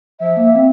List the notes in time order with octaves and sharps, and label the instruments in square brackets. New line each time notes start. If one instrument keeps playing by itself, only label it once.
[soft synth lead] F3 [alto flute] E5
[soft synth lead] A#3
C4